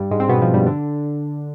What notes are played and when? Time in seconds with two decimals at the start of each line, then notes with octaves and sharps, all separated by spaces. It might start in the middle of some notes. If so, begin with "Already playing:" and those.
Already playing: G2 G3
0.11 G#2 G#3
0.20 C4
0.29 B2 B3
0.42 F3
0.54 G2 G3
0.66 D3 D4